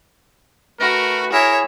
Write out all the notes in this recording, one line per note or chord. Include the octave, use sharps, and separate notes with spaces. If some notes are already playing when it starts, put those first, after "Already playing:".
A3 F#4 A#4 B4
E4 G#4 A#4 C#5 E5